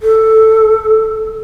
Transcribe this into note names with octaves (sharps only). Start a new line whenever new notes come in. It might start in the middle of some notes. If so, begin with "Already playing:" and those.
A4